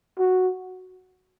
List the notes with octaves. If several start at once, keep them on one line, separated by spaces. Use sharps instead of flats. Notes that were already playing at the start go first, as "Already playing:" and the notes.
F#4